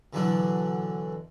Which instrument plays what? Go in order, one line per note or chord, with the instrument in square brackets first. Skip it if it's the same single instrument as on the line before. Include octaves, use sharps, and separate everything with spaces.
[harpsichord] B2 D3 E3 F#3 D4